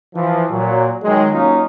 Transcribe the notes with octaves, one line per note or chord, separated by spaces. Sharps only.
E3 F3
A#2 F#3
D#3 F#3 G#3
F#3 A#3 C#4 D#4 F4